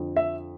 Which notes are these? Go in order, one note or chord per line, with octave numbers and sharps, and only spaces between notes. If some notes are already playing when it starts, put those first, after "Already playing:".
Already playing: F2 D3
E5